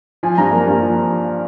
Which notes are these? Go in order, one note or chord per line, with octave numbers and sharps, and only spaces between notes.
F3 G#5
G2 A#5
A#3
G2
F3